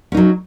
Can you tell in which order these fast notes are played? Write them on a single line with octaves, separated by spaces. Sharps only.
C#4 D#4 F#3